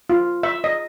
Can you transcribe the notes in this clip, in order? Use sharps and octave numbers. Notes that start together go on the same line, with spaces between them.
F4
E5
D#5